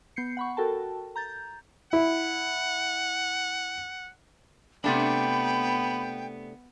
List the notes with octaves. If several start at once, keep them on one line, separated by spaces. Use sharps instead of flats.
B3 G6 C7 C#7
F#5 B5 C#6
F#4 A4 A#4 G5 A5
A#5 G6 A6
E4 F#5
C3 A3 B3 D4 G5 B5